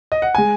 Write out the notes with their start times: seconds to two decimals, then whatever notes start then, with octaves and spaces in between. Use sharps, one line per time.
0.12 D#5
0.22 F#5
0.35 G#3 G#5